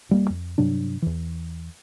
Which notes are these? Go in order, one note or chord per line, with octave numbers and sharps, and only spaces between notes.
E1 G3 A#3
F2
G2 C3 F#3 D4
E2 E3